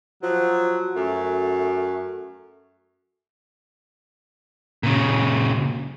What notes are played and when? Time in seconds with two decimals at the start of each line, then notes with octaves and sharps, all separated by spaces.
0.23 F3 F#3
0.96 F#2 A3
4.83 A#2 C#3